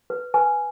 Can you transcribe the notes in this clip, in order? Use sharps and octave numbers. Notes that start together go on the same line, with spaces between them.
B4
B4 G#5